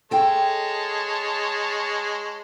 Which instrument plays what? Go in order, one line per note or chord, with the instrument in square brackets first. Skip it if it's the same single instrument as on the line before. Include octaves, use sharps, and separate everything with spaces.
[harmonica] G#3 C#5 A5 [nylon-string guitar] A4 G5